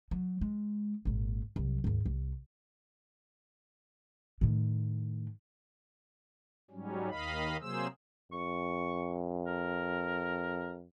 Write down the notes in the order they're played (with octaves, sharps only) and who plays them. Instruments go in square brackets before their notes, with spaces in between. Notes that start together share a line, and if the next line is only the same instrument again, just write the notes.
[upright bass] F#3
G#3
G#1 A#2
C2 F#3
D#2 G#2
C2
A2 D#3
[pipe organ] G#2 F#3 G3 C#4
D#2 D#3 D#5 F5 B5
C3 F#3 A#3 G#4 C5 E6
[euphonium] F2 [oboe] C#6
[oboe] A#4